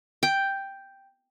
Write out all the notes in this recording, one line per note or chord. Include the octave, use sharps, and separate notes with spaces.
G5